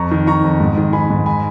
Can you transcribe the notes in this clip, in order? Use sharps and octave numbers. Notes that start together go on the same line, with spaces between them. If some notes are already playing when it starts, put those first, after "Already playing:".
Already playing: F2 A#5 C#6
D#3
D#3 A#5 C#6
F2
G#2
D#3
D#3 G#5 B5
G#2
G#5 B5